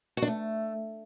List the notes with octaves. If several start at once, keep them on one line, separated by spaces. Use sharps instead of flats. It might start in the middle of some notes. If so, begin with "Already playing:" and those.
F#4
D4
A3